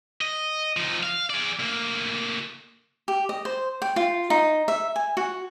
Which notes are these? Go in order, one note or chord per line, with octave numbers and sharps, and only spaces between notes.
D#5
F3 D#4
F5
G#4 D5
D2 A#3
G4
D#5
C5
G5
F4
D#4
E5
G#5
F#4